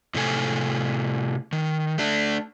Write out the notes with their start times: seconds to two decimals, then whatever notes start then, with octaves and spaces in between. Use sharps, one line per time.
0.14 A2 C3 A4 G#5
1.52 D#3
1.98 A3 D4